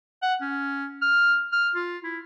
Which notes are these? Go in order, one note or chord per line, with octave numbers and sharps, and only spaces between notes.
F#5
C#4
F6
F6
F4
E4